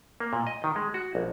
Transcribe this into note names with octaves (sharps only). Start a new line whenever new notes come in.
A#3
A#2
D#5
D#3
G#3
F#4
A#1